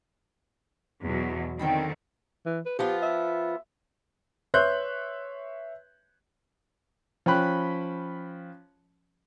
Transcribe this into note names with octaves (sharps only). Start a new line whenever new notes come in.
E2 B2 F#3
D3 D#3 C4 C#5 G5 B5
E3
B4
F3 B3 F4 G4
E5
B4 C#5 E5 C6 F#6 G6
F3 C#4 G5 B5 F#6